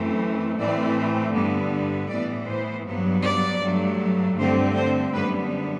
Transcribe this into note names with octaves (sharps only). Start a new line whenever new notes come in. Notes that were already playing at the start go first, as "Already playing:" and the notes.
Already playing: F#2 E3 A3 C4
A2 E3 A3 C4 D5
G2 D3 G3 B3
A2 E3 B3 D5
C5
G2 F#3 B3
D5
G2 F#3 A3
G2 D3 A3 C4 C5
C5
F#2 D3 G3 B3 B4